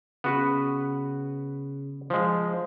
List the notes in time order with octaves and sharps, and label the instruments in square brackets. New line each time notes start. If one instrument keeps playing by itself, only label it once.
[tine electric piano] C#3 [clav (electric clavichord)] B3 F#4 B4
[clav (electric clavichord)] F3 G#3